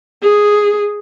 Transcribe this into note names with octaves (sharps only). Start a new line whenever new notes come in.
G#4